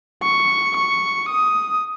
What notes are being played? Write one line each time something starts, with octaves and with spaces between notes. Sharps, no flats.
C#6
C#6
D#6